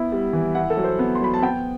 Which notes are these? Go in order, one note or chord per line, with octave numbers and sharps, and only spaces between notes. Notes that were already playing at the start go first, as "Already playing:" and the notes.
Already playing: B3 E4
G3
E3
E4 F#5
A4
F#3
C5
B3
C6
F#3 B5
A5
B3 G5